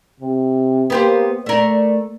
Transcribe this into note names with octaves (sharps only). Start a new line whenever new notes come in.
C3
A#3 B3 G4 C5
A3 A#4 D5